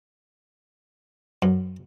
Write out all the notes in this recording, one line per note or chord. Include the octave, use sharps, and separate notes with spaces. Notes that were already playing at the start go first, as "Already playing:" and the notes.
F#2